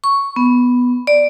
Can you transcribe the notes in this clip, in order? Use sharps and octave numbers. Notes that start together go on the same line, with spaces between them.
C#6
B3
D5